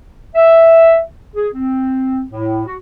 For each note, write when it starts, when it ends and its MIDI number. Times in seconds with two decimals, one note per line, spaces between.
0.35 1.00 76
1.35 1.48 68
1.54 2.23 60
2.30 2.62 45
2.66 2.75 66